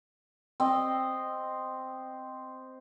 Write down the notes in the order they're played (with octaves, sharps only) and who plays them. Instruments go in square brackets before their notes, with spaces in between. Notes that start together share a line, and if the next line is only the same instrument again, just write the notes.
[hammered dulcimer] C4 D#5